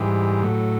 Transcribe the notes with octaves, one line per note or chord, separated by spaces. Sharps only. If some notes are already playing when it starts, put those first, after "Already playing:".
Already playing: G#2 E3 G3
A2 F#3